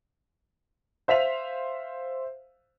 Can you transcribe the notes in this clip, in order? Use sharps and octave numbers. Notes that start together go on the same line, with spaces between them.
C5 E5 F5 B6 F7